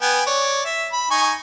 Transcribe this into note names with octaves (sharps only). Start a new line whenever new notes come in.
B3 G5 G#5
C#5 D5
E5
B5
D#4 G#5 C#6